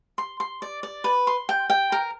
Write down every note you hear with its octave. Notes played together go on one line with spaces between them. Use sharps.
C6
C6
D5
D5
B4
C6
G5
G5
A#4